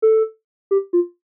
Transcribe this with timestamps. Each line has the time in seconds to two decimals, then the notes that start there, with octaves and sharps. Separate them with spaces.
0.02 A4
0.71 G4
0.93 F4